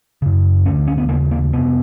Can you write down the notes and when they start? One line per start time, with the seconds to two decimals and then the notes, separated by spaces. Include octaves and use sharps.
0.22 F#2 C#3
0.65 D2 D3 C#4
0.87 C#4
0.98 B3
1.09 D#2 C#3 A#3
1.31 A#3
1.53 F2 C3 B3